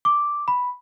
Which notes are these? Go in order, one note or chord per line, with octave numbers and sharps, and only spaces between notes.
D6
B5